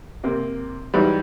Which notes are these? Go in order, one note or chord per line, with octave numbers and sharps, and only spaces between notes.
C3 A#3 C4
G#2 E3 F#3 G3